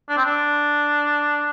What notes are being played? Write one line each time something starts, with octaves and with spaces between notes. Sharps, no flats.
D4
C4
D4